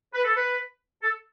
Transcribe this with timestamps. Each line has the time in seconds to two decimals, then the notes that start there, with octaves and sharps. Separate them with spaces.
0.14 B4
0.25 A4
0.36 B4
1.03 A4